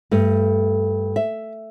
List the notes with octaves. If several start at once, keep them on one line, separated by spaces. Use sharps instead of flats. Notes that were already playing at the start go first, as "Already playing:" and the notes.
G2 A3
E5